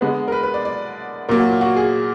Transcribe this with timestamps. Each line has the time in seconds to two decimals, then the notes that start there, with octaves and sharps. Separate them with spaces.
0.01 D3 G#3 B3 B4
0.28 A#4
0.32 B4
0.43 B4
0.54 D5
0.65 D5
1.29 A#2 F#3 A#3 A#4
1.39 F#4
1.49 F4
1.61 F#4
1.76 G#4